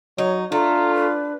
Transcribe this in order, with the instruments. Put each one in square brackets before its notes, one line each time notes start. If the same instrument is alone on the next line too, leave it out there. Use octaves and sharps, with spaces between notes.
[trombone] F#3 [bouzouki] D#4 [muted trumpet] C#5
[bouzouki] A3 [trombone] D4 [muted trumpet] F4 [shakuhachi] A#5
[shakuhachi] B4